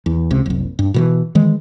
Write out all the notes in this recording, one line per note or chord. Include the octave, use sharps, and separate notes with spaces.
E2
C#2 C3
F#1 C2
G2
B2 D#3 E3
D#3 E3 G#3